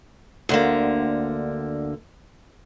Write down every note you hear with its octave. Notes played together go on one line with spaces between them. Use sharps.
D2 D3 A#3